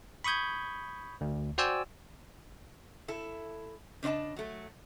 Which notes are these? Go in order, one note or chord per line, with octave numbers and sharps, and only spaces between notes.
B5 C#6 D#6 G6 G#6
D2
F#4 C5 D5 G5 G#5 E6
E4 A4
C#3 D4 C5 D#5 A5
F#3 A3